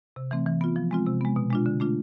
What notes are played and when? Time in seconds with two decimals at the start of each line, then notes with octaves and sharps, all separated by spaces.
0.16 C3
0.31 E3 A3 C4
0.46 E3
0.61 B3 F4
0.76 F3
0.91 G#3 C4 F4
1.06 C3
1.21 G#3 B3
1.36 B2
1.50 G#3 D4 F4
1.66 D3
1.80 A3 D4 F4